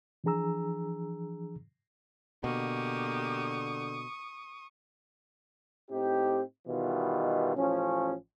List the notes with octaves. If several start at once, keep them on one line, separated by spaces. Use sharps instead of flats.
E3 F3 D4 G#4 A#5 E6
B2 D3 A#3 G4 C#6 D#6
A2 C4 D#4 G4
B2 D#3 E3 G3 F4
A1 F3 C#4